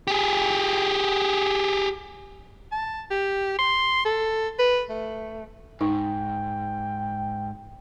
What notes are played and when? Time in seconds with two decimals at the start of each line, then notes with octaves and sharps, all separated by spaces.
0.07 G4 G#4
2.72 A5
3.10 G4
3.59 C6
4.05 A4
4.59 B4
4.89 A3
5.81 G#2 D#4 G5